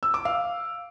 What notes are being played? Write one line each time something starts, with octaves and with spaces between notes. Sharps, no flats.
E6
D6
F5